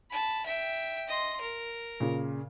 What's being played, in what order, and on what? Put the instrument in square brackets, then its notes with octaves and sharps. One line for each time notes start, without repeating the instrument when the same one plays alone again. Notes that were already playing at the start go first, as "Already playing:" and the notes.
[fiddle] A5 B5
E5 G5
D#5 C6
A#4
[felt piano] A#2 C#3